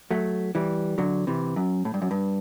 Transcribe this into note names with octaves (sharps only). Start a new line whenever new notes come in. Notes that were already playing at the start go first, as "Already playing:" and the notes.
F#3 A3
E3 G3
D3 F#3
C3 E3
F#2
A2
G2
F#2
G2